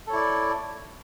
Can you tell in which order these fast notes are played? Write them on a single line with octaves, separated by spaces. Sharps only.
A4 C#5 E4 D5